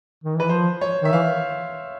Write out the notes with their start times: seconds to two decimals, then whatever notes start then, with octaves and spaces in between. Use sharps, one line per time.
0.24 D#3
0.37 E3 B4
0.49 F3 C5
0.81 C#5
1.02 D#3 E5
1.13 E3 F5